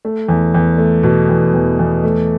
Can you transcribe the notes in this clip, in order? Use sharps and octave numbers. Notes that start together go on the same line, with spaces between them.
A3
E2
E2
A3
B2
E2
E2
E2
A3